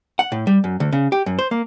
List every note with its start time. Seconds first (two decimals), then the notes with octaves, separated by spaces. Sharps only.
0.19 F#5
0.32 A2
0.47 G3
0.64 F#2
0.80 D2
0.92 C#3
1.12 G4
1.26 F#2
1.39 C5
1.51 A#3